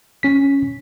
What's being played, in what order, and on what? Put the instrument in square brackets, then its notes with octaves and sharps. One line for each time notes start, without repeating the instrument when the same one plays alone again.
[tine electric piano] C#4 B6